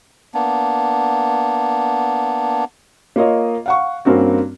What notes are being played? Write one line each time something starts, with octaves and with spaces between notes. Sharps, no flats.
A#3 B3 D4
A#3 F4 C#5 D#5
F5 F#5 C#6
G2 A#3 C4 C#4 F#4